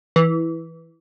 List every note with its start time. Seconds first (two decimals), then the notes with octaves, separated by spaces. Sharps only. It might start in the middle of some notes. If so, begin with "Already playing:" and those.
0.16 E3